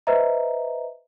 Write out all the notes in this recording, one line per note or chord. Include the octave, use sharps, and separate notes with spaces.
B4 C5 D#5 E5 A#5